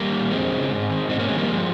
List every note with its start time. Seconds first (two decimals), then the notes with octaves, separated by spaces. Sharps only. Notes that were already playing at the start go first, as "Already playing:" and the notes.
Already playing: G3 A#3
0.12 D#3
0.31 F2 G#3 C4
0.51 C#3
0.71 G#2
0.90 D#3
1.09 G#2 C4 D#4
1.19 A#3 C#4
1.28 D#3 G#3 C4
1.38 G3 A#3
1.48 G2 F3 G#3